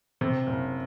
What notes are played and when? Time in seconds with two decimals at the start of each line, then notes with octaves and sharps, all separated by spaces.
0.21 C3
0.47 F#1